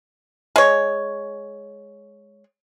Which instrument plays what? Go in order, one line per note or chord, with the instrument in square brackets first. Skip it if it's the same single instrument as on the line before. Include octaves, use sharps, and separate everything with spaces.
[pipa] G#3 C#5